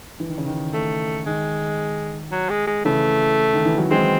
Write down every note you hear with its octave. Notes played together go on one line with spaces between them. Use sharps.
E3
D#3
C#3
D#3
A3
D#3 G#3
F#3
G#3
G#3
C#3 E3 A3
D#3
E3
F#3
E3 G#3 C4